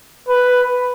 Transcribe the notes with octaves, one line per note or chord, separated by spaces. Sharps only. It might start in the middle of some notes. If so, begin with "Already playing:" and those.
B4